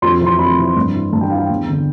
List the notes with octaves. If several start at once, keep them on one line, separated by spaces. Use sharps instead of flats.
F2 C6
C3 E3
C6
F2 B5
C3 E3
G2
E3
G2 A5
G5
E3 F5
G5
E2
D3